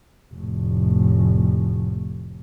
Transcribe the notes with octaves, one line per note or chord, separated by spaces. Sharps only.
F1 A2